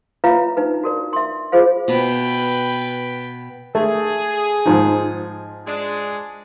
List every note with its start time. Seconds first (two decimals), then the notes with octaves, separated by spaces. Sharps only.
0.24 F4 B4 C#5 E5 F5 A#5
0.57 D4 D#4 B4
0.83 F#4 A#4 D5
1.13 E5 C6
1.52 F4 G#4 C5 F5
1.88 B2 B4 G5
3.75 A3 G#4
4.66 G#2 F3 D#4
5.66 G#3 D4 G#4